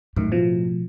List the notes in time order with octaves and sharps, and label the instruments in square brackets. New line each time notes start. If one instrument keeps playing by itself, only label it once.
[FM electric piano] F#2 D#3 [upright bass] A2
[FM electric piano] B2 F3